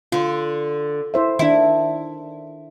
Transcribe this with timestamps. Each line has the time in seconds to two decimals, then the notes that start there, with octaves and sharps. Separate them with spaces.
0.12 D3 F4
1.14 E4 C5 E5
1.39 D#3 D4 E4